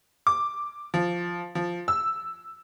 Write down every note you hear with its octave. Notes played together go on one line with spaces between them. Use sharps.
D6
F3
F3
E6